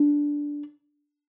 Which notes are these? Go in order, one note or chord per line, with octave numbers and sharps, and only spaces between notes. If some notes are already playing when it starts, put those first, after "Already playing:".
Already playing: D4